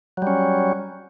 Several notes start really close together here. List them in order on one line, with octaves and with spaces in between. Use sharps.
F#3 G3 C#4